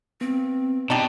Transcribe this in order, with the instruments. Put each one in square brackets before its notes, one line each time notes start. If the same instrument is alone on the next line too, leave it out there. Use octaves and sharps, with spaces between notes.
[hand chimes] B3 [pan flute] C4
[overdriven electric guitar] B2 [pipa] G3 D4 D#4